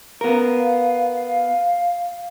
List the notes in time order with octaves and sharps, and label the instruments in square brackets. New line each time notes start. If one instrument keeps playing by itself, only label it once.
[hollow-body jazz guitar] B3 A#4 [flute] F5